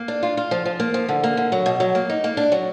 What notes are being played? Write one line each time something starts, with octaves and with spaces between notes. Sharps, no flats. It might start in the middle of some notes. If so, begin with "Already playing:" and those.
Already playing: A#3
D4
F4
F4
F3
F3
A#3
F3
D3
A#3
D3
F#3
B2
F#3
A#3
D#4
A#3
D4
F#3